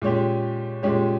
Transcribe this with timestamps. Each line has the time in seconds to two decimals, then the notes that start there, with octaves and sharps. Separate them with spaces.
0.02 A#2 G#3 C#4 G4
0.83 A#2 G#3 C#4 G4